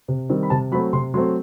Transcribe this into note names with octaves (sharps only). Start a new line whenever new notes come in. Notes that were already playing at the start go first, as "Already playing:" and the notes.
C3
D#3 G3 C4
B5
C3 A5
F#3 A3 C4 B5
C3 C6
F#3 A3 C4 C6